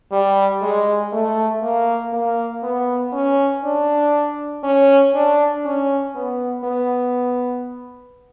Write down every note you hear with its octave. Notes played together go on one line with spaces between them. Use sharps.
G3
G#3
A3
A#3
A#3
B3
C#4
D4
C#4
D4
C#4
B3
B3